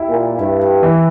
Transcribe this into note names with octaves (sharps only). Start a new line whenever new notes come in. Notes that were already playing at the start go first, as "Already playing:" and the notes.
Already playing: E4 G4
A#2
G2 E4
E3